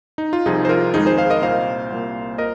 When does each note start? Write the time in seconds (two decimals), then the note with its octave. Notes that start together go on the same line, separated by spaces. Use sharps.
0.18 D#4
0.33 F4
0.46 C2 C3 F3 D#4 G#4
0.65 C5
0.69 F4 A#4
0.94 F2 D#3 G#3 D#4 G#4
1.06 G#4 C5
1.18 C5 F5
1.30 A#4 D#5
1.42 C2 A#2 A#3 C5 F5
1.90 C2 A#2 A#3
2.38 A#2 A#4 D#5